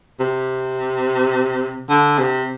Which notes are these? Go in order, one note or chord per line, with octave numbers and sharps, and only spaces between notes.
C3
D3
C3